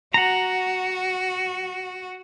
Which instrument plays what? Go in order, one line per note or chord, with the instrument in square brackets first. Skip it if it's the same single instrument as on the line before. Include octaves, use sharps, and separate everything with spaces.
[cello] F#4 [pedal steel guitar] F#5 A#5